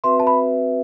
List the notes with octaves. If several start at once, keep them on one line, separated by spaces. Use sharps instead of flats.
C4 F#4 B4 E5 C6
A5
B5